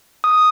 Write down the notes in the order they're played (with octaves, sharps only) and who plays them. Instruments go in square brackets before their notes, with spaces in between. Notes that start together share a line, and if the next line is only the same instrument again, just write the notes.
[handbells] D#6